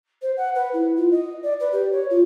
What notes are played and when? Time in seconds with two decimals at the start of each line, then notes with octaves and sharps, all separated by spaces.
0.21 C5
0.36 F#5
0.55 B4
0.73 E4
0.96 F4
1.11 D#5
1.42 D5
1.59 B4
1.72 G4
1.92 C#5
2.10 F4